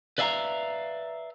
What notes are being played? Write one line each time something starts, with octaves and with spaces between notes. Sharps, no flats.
B4 D5 E5 F5 G#5 A#5